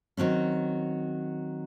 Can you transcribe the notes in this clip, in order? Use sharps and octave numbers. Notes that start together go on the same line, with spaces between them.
D#3 F#3 C4 C#4